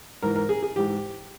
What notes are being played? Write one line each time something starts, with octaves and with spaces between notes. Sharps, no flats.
G#2 E3 A#4
A#4
G#4
G#4
G#2 E3 G4